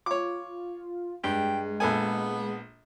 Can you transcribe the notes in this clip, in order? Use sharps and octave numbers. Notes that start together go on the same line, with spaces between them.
F4 C#5 D6
G2 G#3 G4
A#1 B3 A4 G#5